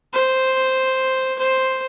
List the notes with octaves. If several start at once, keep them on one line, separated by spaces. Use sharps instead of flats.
C5
C5